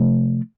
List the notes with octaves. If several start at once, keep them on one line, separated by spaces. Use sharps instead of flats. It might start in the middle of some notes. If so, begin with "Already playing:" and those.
Already playing: C3 F3 A3